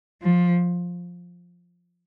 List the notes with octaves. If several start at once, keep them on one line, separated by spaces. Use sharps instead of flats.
F3